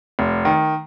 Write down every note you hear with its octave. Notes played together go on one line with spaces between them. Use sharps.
F1
D#3